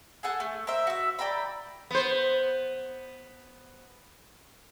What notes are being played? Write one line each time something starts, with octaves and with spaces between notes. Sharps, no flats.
G#4 A4 F#5 G#5
A3
A#4 C5 E5
F#4 E5
D5 G5 A#5 B5
B3 C5